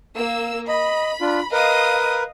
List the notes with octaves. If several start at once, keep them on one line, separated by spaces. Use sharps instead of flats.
A#3 E6
D#5 B5
D4 F4
A#4 B4 D#5 F5 D#6